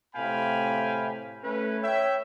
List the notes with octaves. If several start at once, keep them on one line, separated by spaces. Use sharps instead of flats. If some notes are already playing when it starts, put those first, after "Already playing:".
A2 C3 F5 G5 G#5 B5
A3 C#4 B4
C#5 E5 G5